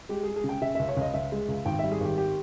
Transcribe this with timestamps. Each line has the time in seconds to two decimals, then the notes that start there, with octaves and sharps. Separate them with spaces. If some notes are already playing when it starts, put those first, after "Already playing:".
0.09 G#3 G4
0.23 G#4
0.28 G#3
0.36 G#4
0.44 C#3 G5
0.62 C#3 E5
0.75 C#2 E5
0.88 C#5
0.97 C#2 D#5
1.14 C#2 E5
1.32 G#3
1.48 C#2
1.66 G#1 G5
1.79 G3 E5
1.92 G#4
2.00 G#1 G4
2.18 G4